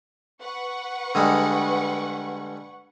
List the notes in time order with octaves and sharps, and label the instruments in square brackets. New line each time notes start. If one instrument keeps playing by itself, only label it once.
[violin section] B4 F#5 C#6
[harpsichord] D3 G3 G#3